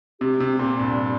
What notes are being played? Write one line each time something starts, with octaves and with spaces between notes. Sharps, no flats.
C3 G4
C3
A#2
G2